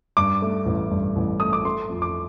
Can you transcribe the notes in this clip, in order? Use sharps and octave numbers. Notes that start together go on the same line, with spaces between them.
G2 D6
A3
A1
G2
A1
A3 D#6
D6
A3 C6
F2
D6